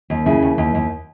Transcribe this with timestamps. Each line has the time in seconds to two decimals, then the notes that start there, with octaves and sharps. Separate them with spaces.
0.10 D#2
0.26 C#3 E4
0.42 D#2
0.58 D#2
0.75 D#2